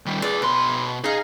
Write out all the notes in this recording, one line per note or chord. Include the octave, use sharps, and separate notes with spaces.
D#3 G3
G#4 B4 D5
B2 B4 C6
D#4 G#4 F5